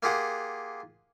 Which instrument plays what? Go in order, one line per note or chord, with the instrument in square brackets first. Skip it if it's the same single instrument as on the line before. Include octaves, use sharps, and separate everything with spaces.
[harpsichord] A#3 F4 G4 G#4 F#5